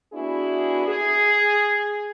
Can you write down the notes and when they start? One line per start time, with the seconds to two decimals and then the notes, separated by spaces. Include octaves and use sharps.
0.13 B3 D4 E4 F#4 G#4
0.87 G#4